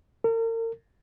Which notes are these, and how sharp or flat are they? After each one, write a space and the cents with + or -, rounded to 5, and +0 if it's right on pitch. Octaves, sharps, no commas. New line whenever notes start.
A#4 -40